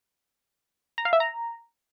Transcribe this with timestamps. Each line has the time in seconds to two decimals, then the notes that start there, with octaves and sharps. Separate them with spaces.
0.98 A#5
1.05 F5
1.13 E5
1.20 A#5